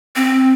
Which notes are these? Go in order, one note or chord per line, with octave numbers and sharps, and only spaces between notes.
C4